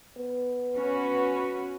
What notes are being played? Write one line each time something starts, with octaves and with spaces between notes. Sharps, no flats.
B3
C#4 F#4 B4